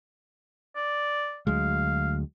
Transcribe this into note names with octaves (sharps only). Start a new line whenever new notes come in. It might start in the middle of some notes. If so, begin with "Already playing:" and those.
D5
D2 F#3 G#3 F5